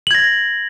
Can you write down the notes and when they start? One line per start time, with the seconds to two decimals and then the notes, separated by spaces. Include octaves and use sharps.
0.07 F#7
0.11 G#6
0.14 A#6